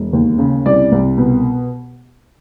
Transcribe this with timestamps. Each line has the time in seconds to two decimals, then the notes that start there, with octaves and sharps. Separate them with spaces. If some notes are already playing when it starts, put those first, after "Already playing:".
Already playing: E1
0.13 D#2
0.39 C#3
0.66 C2 D5
0.92 C2
1.18 B2